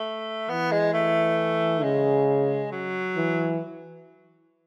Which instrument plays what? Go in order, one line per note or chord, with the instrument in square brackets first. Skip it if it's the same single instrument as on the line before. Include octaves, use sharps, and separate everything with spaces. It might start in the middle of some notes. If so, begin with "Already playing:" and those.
Already playing: [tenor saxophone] A3
[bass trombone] E3 [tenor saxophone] B3
[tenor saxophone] G#3
A3
[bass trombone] C#3 [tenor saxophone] G#3
[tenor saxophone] F#3
[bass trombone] E3